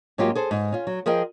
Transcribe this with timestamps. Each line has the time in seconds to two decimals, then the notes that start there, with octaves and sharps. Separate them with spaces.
0.18 G#2 F#3 A#3 C#4 F4 G4
0.35 G#4 A4 C5
0.51 G#2
0.72 C#4 F4
0.87 F#3
1.06 F3 G#4 A#4 D#5 G5